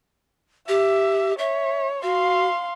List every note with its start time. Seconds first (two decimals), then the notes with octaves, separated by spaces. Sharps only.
0.69 G4 E5
1.39 C#5 E5
2.03 F#4 F5 C6